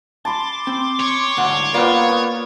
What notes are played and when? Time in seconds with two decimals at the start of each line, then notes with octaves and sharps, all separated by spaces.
0.25 A5 B5 C6 D6
0.67 C4
1.01 C#5
1.37 D2 G#2 F#5
1.74 A#3 B3 F4 D5
2.09 D6